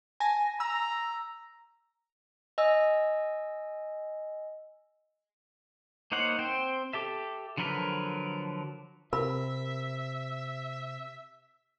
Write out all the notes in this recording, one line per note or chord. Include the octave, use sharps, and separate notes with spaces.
G#5 A5 A#6
A#5 E6
D#5 G#5 E6
A#3 D#4 C5 C#5 F#5
C4 C5 G5
G4 A4 E5
D3 F3 F#3 A#4 B4
C3 A#4 E5 B5